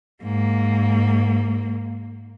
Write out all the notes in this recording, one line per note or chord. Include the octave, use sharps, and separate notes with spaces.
G#2 A#3